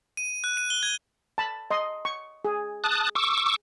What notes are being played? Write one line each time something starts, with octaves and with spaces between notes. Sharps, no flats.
D#7
F#6
D#7
G7
G#6
A5 B5
D#5 C6
C#6
G#4
A5 D#6 F#6
C#6 D6 E6